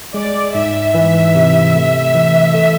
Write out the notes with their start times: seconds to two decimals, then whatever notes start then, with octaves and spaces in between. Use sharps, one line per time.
0.14 G#3 D5
0.55 G#2 E5
0.94 E3 E5
1.35 C3
1.75 A3
2.15 E3
2.54 A3